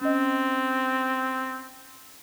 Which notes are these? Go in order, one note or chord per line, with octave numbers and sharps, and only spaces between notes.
C4 C#4 D#5